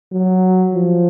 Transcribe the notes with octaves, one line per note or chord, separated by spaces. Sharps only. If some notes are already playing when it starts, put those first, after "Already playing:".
F#3
F3